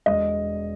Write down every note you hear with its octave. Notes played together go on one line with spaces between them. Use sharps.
E1 D#5